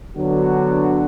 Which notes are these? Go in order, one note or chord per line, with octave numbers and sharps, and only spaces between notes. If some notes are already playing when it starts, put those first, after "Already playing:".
D3 F#3 B3 D4 F#4